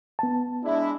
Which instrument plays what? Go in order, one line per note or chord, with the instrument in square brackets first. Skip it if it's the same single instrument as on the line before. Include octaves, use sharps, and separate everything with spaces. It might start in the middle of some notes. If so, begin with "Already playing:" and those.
[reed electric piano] B3 A5
[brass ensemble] G#3 D4 E4